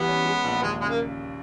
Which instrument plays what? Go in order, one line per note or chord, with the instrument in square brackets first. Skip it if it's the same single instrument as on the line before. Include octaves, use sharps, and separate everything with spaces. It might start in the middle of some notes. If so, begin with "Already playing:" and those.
Already playing: [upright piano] E3 G3 [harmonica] B3
[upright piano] C#4
G#3
A#1
[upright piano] D#2 [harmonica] G#3
[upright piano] C#3 [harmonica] G#3
[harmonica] A#3